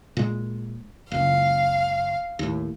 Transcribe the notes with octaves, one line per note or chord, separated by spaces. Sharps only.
A#2 G#3
F#1 C#2 F5
D#2 A2